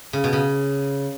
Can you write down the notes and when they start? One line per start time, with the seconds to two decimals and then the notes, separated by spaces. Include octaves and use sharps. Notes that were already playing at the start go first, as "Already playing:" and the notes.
0.13 C#3
0.24 B2
0.33 C#3